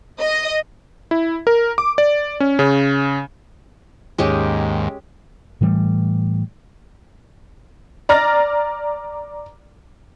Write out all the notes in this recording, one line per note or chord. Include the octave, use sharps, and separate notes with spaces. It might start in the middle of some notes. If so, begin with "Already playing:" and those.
D#5
E4
A#4
D6
D5
C#4
C#3
D#2 G#2 G#3 C#4 G4
A2 E3 G3 A3
D5 A#5 F6 A6 A#6